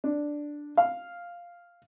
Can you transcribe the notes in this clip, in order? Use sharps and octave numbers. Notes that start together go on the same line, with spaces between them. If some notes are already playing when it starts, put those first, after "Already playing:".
D4
F5